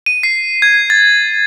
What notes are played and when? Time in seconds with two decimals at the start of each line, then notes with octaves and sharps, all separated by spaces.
0.06 D#7
0.23 C7
0.62 G#6
0.90 A6